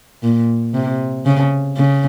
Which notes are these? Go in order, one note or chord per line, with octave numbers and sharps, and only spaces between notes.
A#2
C3
C#3
C#3